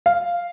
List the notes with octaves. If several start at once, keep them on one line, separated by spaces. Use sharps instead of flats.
F5